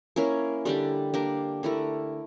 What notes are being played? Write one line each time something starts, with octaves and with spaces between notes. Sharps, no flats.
A#3 C#4 E4 A#4
D3 G3 D4 G4
A#3 D4 G4 A#4
D3 A3 E4 A#4